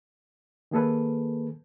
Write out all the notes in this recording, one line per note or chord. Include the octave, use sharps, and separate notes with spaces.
D#3 A#3 G#4 A4 B4